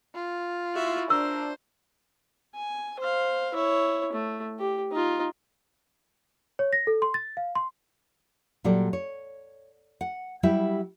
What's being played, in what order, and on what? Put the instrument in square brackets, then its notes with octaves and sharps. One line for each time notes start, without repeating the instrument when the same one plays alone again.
[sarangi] F4
[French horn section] E4 [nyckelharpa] F#4 E5
[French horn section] D4 [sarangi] A#4 [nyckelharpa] C5 [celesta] E6
[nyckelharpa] G#5
C5 F5
E4 C#5
A3
G4
D#4 F4
[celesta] C#5
A#6
A4
C6
A6
F5
C6
[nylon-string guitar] A#2 F#3 G3 A4 D5
C#5
F#5
F#3 G3 E4 G4 E5